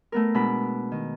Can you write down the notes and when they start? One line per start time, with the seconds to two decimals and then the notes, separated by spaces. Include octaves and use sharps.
0.12 A3 B3 A#4
0.34 B2 G#3 D4 B5
0.92 D#3